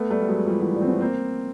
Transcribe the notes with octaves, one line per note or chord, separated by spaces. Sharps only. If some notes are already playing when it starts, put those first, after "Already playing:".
Already playing: A3 B3
G3 A3
G3
F#3 G#3
F3 G3
E3 F#3
F3 G3
C4
B3 C#4
A#3 C4